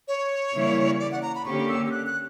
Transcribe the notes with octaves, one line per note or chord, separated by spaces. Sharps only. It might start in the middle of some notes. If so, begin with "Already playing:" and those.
C#5
C#3 E3 G3 A#3 E4
D5
F#5
A#5
B5
D3 A#3 C#4 G4 C#6
E6
E6
F#6
F#6